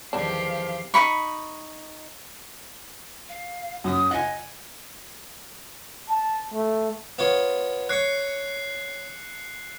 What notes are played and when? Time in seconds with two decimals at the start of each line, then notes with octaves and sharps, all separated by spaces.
0.13 E2 D#3 F3 G3 D4 G4 F5
0.94 D#4 E4 B5 C#6
3.29 F5
3.84 F#2 D#6
4.11 D#5 F#5 G#5
6.10 A5
6.54 A3
7.19 B3 F4 C#5
7.89 C#5 C#6 F#6 C7 C#7